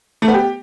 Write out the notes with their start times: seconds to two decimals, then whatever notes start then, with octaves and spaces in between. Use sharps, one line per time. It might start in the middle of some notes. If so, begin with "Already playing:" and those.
0.22 A3
0.28 B3
0.34 G4